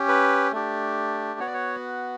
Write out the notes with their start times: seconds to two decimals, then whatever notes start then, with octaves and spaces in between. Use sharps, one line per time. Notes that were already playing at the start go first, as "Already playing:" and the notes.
Already playing: C#4 G4
0.09 B4
0.52 A3 D4 G4
1.40 B3 F#4 C#5
1.47 D5
1.54 C#5